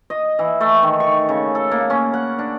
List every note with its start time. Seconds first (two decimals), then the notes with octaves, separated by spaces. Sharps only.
0.10 D#5
0.39 E3
0.60 A3
0.83 D#3
1.00 C#6
1.29 C#3
1.55 A4
1.71 A#3
1.90 C#4
2.14 F#5
2.39 D4